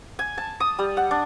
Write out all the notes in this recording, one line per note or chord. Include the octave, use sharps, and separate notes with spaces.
G#5
A5
D#6
G3
F#5
D4